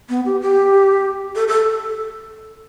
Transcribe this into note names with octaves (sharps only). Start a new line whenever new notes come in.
B3
G4
G4
A4
A4